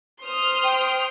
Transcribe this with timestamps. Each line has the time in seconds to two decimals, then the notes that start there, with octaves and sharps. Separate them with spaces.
0.24 C5 C6 D#6 F6
0.64 G5